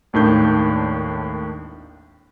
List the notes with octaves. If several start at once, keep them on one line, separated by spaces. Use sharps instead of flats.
G#1 D#2 A2 D#3 D4 G6